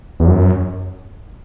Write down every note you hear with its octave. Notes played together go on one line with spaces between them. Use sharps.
E2
F#2